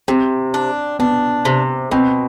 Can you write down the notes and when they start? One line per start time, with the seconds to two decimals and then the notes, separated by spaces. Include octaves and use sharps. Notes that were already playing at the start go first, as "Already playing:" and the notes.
0.08 C3 C4
0.54 D4
0.99 B3 D4
1.45 C3
1.91 B2 C4